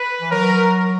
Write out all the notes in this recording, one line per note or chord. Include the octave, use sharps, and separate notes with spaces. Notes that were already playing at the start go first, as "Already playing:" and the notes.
Already playing: B4
E3
F#3 A#4